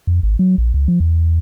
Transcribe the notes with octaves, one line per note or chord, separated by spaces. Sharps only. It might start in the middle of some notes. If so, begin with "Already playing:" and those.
F2
G#1
F#3
A#1
C#2
F3
E2